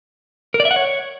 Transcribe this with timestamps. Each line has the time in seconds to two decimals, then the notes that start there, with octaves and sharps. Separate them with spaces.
0.54 A#4
0.60 D5
0.65 E5
0.71 F#5
0.76 C#5